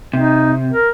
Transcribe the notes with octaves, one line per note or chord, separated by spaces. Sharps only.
C3 D#4
A#4